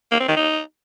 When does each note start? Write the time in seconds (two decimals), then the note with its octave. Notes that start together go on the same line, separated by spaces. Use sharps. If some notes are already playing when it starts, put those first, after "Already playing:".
0.12 A#3
0.20 C4
0.29 D#3
0.37 D#4